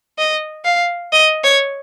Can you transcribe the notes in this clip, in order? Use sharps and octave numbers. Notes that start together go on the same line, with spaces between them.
D#5
F5
D#5
C#5